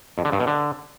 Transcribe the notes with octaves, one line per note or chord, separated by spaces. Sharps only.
F2
D3
G2
B2
D3